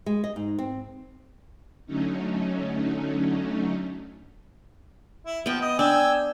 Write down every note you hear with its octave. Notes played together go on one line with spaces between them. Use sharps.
G#3
D#5
G#2
C4
D3 F#3 A3 C#4 D#4
E4
F3 B3 G5
D#5
D4 G5 G#5 E6